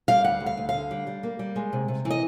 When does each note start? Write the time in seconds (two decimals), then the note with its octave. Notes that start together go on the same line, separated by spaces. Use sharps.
0.08 G3 F5
0.24 D2 F#5
0.40 D2
0.46 F5
0.57 D2
0.69 F5
0.74 D3
0.91 G3
1.07 G3
1.23 A#3
1.39 G3
1.56 G#3
1.73 C3
1.88 C3
2.05 E3
2.11 D#5